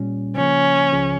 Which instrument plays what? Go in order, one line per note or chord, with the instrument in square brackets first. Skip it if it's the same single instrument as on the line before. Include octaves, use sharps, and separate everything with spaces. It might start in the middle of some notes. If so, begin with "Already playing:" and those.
Already playing: [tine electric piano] A#2 G3 C#4
[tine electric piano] C#3 F3 A#3 [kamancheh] C#4
[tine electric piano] C#2 C#3 F3